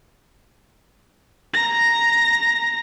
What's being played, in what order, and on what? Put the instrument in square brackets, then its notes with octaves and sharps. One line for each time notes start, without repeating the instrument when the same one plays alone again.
[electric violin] A#5 A#6